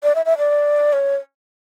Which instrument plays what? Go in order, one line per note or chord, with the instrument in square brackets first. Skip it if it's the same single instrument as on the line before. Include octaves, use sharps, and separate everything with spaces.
[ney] D5
E5
E5
D5
C#5